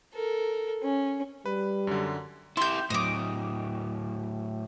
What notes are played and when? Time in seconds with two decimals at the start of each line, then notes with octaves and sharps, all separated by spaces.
0.14 A4 A#4
0.82 C#4
1.46 G3 B4
1.87 F#2 D3
2.57 E4 G4 C6 G6
2.90 A2 F#3 D#5 D6